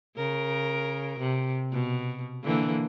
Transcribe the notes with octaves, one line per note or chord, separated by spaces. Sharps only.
C#3 A#4
C3
B2
D3 E3 A#3